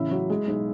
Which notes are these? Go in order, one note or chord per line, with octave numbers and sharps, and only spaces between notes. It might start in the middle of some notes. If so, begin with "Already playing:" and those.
Already playing: A1 C#3 E4 E5
F#3
G#3
B1